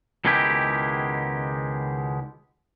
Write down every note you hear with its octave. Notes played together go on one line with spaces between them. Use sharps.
C#2 B2 D#3 G#3 E4 G4